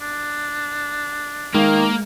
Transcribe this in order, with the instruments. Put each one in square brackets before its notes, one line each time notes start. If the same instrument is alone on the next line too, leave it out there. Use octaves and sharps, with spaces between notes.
[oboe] D4
[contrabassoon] D#3 [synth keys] G#3 [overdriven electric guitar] A#3